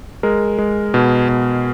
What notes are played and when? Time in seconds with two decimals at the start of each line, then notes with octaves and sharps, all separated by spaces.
0.23 G#3 A#4
0.58 G#3
0.94 B2
1.29 B2